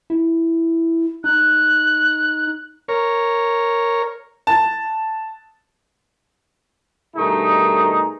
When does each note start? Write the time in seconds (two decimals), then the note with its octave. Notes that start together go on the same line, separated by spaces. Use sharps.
0.10 E4
1.24 D#4 F#6
2.88 A#4 C#5
4.47 A5
7.16 G2 B2 D#3 A3 D#4 G#4